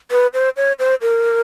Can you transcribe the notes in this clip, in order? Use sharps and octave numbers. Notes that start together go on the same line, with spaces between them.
B4
C5
C#5
C5
A#4